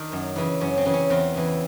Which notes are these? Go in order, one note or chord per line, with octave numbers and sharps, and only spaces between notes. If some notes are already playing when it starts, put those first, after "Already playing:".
Already playing: D#3 D4
F#2
C#3 E3
F#2 C#4
C4
C#3 E3
C#4
E2 C4
C#3 E3